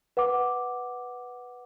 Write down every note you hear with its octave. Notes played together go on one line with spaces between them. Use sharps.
B4 F#5 D6